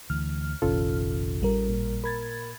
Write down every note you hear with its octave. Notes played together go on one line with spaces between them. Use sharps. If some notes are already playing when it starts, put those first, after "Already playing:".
D2 E3 F6
F1 A#1 D#3 C#4 F4 A4
A1 G3 A#4
A#2
A#4 B5 G#6 A6